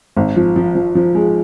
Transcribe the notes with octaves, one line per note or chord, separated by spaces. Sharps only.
G#1
F3
F3
F3
F3
G#3